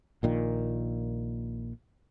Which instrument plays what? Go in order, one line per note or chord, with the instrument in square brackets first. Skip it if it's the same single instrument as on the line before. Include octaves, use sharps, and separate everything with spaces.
[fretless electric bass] A#1 A#2 D#3